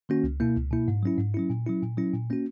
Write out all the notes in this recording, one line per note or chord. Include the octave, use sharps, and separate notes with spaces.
D#3 A#3 C#4 F#4
C#2
B2 A#3 E4
C#2
B2 A#3 E4
G#2
F#3 C#4 E4
G#2
F#3 C#4 E4
A#2
F#3 C#4 E4
A#2
F#3 C#4 E4
A#2
A#3 C#4 F#4